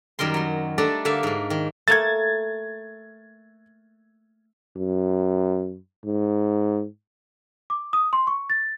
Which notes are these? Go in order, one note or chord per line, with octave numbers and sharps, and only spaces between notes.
F#2 D#3 G3 A#4 C6
F#3 C6
G3 A3 D4 A4 D5 A#5
D3 A#3 E5 F5 A5
G#2 A#3
D#3
A3 A#3 A4 G#6 A6
F#2
G#2
D6
D#6
C6
C#6
A6